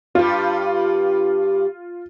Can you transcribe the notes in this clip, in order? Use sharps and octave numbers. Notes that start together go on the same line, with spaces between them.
G2 G3 F4